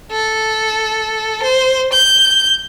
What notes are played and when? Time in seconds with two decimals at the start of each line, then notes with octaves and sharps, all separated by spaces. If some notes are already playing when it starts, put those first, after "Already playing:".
0.11 A4
1.43 C5
1.93 G6